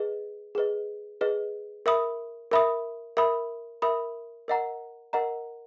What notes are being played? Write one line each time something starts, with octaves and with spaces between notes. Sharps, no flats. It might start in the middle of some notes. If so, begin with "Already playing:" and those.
Already playing: G#4 B4 D#5
G#4 B4 D#5
G#4 B4 D#5
A#4 E5 B5 D#6
A#4 E5 B5 D#6
A#4 E5 B5 D#6
A#4 E5 B5 D#6
A#4 D#5 F#5 A#5
A#4 D#5 F#5 A#5